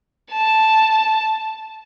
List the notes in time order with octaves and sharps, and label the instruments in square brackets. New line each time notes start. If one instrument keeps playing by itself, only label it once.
[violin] A5